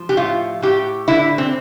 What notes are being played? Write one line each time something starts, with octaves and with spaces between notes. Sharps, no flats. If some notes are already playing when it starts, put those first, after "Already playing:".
Already playing: F3
G4
A2 F4
A2 G4
D3 E4
C4